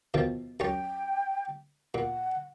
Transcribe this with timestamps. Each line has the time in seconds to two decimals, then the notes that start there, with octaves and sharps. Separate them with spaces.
0.14 B2 D#3 F3
0.60 F#2 C#4 G5
1.94 A#2 F#5